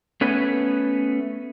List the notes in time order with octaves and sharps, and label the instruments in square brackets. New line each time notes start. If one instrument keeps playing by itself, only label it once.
[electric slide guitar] A3 B3 C#4 B4